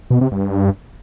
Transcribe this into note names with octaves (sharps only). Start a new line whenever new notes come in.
B2
C3
G2